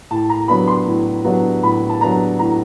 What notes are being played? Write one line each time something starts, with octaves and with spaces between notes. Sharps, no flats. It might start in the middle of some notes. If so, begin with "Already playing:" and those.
A2 A5
A#5
F#3 B3 D4 B5
C6
A2
F#3 B3 D4
A2 B5
A5
F#3 B3 D4 A#5
A2 A#5